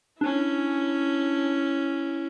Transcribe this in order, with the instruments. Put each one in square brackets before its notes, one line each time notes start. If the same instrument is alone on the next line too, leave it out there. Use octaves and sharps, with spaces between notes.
[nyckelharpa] C#4 E4 [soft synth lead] D4